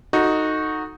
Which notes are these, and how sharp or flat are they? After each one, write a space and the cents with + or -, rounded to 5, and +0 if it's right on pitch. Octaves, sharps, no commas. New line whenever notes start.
D#4 +0 F#4 -10 A4 +10